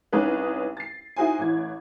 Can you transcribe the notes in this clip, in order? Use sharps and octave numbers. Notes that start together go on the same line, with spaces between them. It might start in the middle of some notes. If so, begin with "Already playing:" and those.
C2 C#4 D#4 G#4 B4
A6 C7
D#4 E4 F#4 G#4 C5 G#5
A1 E3 G#6